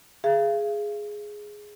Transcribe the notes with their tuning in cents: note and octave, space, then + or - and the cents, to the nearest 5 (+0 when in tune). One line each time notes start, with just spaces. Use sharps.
G#4 +0 F5 -35